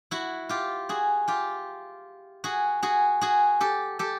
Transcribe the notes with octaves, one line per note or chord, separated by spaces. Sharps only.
E4 F#4
F4 G4
F#4 G#4
F4 G4
F#4 G#4
F#4 G#4
F#4 G#4
G4 A4
G4 A4